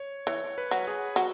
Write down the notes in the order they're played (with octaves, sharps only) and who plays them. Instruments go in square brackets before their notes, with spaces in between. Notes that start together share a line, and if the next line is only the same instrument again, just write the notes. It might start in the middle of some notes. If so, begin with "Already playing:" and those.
Already playing: [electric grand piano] C#5
[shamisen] E3 [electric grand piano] C#5
[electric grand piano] B4
[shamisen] F#3
[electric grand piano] G#4
[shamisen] F#3 [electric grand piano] F#4